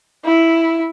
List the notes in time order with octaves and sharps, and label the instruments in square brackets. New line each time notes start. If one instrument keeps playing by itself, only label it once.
[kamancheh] E4